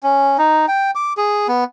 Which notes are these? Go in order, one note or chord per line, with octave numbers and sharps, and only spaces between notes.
C#4
D#4
G5
D6
G#4
B3